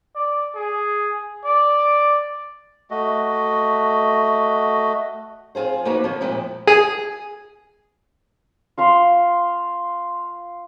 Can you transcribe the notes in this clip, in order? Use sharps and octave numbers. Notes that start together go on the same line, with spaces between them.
D5
G#4
D5
A3 F#4 D#5
F2 F4 G#4 C5
A#3 B3 D4 D#4 F#4 B4
D3 F3
F2 A#2 F3 G#3 E4
G#4 G#5
F4 F5 C6